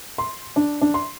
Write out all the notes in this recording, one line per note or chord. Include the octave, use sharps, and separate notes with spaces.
C6
D4
D4
C6